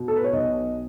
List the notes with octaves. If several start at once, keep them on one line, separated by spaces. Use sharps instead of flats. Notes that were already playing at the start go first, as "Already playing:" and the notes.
Already playing: B2
A4
B4
C#5
B1 D#5